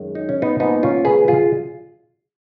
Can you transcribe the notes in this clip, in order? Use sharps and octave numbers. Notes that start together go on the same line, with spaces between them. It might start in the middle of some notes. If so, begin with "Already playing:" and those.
Already playing: F#2 D#3 G#3
D#4
C#4
B3 D#4
G#2 F3 A#3 B3 D#4
C#4 F4
G#4 B4
F4 G#4